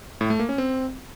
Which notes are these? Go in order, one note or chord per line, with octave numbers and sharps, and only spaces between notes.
A2
A3
A#3
C#4
C4